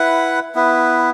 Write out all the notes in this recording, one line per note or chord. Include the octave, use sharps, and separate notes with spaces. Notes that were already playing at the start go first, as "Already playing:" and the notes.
Already playing: E4 B4 F#5
B3 E4 B4